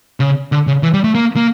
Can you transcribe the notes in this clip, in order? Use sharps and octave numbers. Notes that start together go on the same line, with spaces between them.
C#3
D3
C#3
E3
G3
A3
A#3
A#3